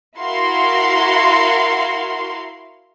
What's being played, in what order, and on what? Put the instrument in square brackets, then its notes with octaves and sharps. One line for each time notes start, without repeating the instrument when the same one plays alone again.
[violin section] E4 F#4 A#4 F5 C6